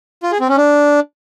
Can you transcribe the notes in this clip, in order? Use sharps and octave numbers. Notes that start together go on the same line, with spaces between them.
F4
G#4
C4
C#4
D4